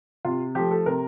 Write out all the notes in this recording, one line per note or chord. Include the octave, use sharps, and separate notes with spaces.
C3 F4
F3 A3 G4
A4
C3 A#4